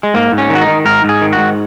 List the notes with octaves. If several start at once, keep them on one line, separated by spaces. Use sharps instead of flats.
G#3
G#2 A#3
G#2
C#4
D#3
F#4
D#4
D#3
G#2 A#4
G#2
G#4
D#3
F#4
G#2